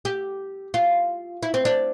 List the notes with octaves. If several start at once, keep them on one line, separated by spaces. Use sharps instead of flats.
G4
F4
E4
C4
D4